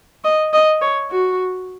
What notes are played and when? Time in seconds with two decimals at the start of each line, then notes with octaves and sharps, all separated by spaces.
0.24 D#5
0.53 D#5
0.81 C#5
1.11 F#4